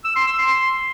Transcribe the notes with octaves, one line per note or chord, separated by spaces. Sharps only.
E6
C6
E6
C6